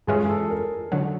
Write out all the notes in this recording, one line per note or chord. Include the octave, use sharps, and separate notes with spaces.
G2 E3 G#3 C#4 F4 G#4
A4
A#4
D3 F#3